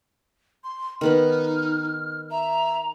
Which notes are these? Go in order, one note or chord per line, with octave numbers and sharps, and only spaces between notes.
C6
D#3 B3 D#4 B5 F6
E5 A#5